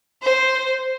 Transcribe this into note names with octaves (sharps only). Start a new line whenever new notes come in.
C5